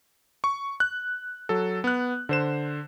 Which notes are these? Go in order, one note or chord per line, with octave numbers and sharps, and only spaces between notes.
C#6
F#6
F#3 A4
B3 F#6
D3 C5 E7